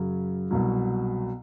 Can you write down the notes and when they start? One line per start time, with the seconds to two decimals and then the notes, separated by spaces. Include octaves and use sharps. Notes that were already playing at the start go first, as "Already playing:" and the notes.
Already playing: F#2 C#3 F#3
0.51 C2 B2 F#3